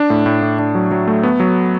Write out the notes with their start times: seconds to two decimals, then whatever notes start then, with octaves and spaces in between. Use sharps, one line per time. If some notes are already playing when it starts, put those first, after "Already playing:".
Already playing: D4
0.10 A2
0.26 A2
0.42 A2
0.59 D4
0.75 F#3
0.91 F#3
1.08 A3
1.23 B3
1.40 F#3